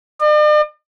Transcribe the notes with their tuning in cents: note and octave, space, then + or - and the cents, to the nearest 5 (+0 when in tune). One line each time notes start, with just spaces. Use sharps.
D5 +45